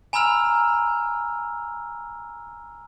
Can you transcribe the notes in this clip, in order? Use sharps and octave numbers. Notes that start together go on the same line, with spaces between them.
G#5 A#5 B5 E6 F6 F7